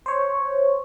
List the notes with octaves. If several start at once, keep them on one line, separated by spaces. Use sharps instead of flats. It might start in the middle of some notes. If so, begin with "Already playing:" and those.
C5 C#5